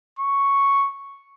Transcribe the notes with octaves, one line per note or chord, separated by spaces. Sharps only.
C#6